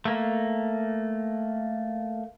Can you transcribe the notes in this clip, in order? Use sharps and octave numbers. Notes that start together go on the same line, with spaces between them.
A3 A#3